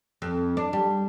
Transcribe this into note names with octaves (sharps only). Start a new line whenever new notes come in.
F2
D4
G3